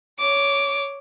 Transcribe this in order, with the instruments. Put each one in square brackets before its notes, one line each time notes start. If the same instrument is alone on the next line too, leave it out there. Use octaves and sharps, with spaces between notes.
[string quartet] C#5 D6